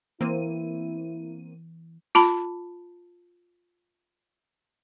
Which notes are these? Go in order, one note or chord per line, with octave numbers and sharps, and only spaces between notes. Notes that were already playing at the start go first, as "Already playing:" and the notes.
E3 A#3 C4 E4 D#7
F4 A5 B5